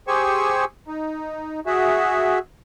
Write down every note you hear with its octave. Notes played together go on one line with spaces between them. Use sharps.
G4 G#4 C5 G#5 C#6 E6
D#4
F#4 G#4 E5